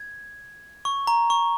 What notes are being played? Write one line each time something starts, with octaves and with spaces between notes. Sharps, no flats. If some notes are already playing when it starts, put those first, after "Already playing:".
Already playing: G#6
C#6
A#5
C#6